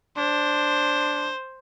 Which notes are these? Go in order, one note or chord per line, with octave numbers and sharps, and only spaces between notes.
D4 C5